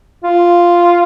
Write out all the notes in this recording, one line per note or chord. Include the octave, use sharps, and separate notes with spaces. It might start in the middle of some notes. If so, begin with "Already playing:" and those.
F4